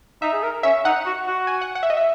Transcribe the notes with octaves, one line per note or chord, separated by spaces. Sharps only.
D#4 E5
G#4
A#4
C#4 E5
D#4 F#5
F#4
F#4
G#5
F#5
F#5
E5
D#5
E5